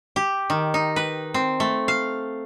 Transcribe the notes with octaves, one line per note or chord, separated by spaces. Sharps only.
G4
D#3
D#4
B4
C4
A3
F5